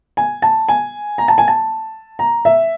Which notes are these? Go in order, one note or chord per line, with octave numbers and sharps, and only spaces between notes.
G#5
A5
G#5
A#5
A5
G#5
A5
A#5
E5